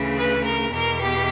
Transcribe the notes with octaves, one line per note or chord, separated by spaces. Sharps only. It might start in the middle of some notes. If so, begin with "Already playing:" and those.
Already playing: D2 C#3 E3
B4
A#4
E2 B2 A#4
G4